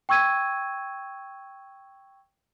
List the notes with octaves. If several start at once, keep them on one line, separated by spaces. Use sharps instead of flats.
G5 C#6 E6 G#6 D#7